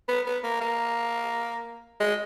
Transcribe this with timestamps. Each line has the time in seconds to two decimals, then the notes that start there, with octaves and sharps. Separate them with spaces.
0.08 B3
0.26 B3
0.44 A#3
0.61 A#3
2.00 G#3